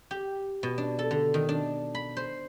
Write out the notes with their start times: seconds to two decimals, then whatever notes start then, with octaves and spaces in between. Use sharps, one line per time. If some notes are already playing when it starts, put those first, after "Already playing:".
0.11 G4
0.63 B2
0.78 D4
0.99 A4
1.11 D3
1.34 D#3
1.49 D4
1.95 B5
2.17 C5